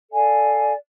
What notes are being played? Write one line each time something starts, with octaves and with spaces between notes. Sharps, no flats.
A4 D5 F5 G#5